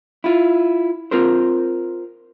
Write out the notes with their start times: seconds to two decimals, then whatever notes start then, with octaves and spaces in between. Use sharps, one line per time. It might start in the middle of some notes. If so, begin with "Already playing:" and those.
0.24 E4 F4
1.11 C4 F4 A#4 C5